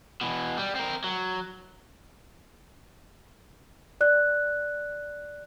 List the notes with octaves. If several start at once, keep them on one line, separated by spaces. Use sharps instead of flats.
B2 E3
G3
C4 A#4
F#3
D5 F#6